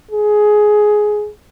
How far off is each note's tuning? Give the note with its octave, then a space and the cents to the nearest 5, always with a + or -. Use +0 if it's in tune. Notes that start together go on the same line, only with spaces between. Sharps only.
G#4 +15